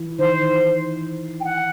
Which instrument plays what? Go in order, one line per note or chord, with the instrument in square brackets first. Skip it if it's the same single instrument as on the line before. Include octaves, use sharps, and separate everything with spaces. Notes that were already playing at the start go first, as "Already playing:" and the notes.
Already playing: [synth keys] E3 E4
[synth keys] D#3 D#4 [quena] C5
[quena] G5
F#5